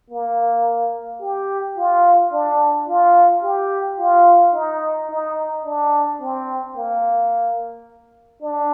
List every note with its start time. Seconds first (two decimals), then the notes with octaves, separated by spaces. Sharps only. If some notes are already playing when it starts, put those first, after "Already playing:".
0.10 A#3
1.21 G4
1.77 F4
2.32 D4
2.88 F4
3.43 G4
3.99 F4
4.54 D#4
5.10 D#4
5.65 D4
6.20 C4
6.76 A#3
8.42 D4